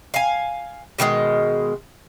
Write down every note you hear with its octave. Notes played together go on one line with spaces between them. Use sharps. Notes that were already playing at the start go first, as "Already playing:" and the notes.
F5 G#5
B2 D#3 G3 G#3